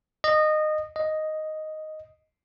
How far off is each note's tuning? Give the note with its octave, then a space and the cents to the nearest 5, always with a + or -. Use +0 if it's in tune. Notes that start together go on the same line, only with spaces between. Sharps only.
D#5 -20
D#5 +0